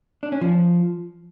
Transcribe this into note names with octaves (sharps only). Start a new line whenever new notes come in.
D4
C#4
F3